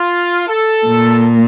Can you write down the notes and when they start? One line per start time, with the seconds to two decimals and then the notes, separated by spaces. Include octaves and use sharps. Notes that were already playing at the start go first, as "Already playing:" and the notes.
Already playing: F4
0.48 A4
0.86 A#2